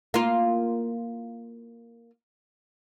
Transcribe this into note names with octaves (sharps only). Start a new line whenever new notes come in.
A#3 F4